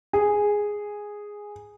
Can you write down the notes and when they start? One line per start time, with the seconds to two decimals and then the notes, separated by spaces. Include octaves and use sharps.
0.13 G#4